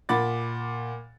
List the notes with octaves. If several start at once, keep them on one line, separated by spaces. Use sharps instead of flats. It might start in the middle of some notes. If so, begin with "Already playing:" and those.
A#2 F#5 B5 D6 A6